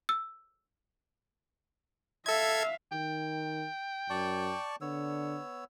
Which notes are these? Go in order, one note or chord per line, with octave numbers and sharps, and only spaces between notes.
E6
A4 E5 F5 G#6
D#3 G5
F#2 D5 A5 C#6
D3 B3 C#5 E6